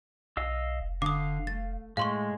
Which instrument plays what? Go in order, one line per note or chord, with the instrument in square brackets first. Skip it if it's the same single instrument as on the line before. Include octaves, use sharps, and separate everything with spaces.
[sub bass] B1 [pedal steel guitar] D#5 F5 E6
[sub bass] F1
[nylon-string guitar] D3 [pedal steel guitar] F5 [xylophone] D6 D#6
[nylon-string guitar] A3 [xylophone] A6
[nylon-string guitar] A2 [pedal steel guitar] G#3 [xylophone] F5 C6 C#6